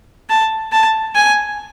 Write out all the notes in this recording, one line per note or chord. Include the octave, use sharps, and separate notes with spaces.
A5
A5
G#5